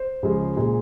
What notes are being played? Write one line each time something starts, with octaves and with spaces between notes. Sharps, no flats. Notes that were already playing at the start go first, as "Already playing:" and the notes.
Already playing: C5
C#2 C#3 F3 G#3
A#2 G#3